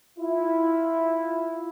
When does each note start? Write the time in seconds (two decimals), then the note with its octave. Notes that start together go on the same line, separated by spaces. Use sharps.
0.19 E4 F4